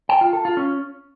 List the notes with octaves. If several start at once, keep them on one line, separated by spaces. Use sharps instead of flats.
G5
F4
A4
F4
C#4